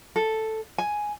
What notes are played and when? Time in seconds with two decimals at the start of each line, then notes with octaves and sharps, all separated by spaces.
0.16 A4
0.78 G#5